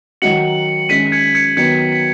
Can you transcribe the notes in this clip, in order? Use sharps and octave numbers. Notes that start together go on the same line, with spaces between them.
D#3 F#3 D#4 F#4 C#7 F#7
F#2 D#3 G#3 B6 D#7
G#6 C#7
G#6 C#7
D#3 F#3 B3 G#6 C#7
B6